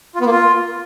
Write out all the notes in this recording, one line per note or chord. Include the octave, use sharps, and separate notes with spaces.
F4
B3
A#3
F4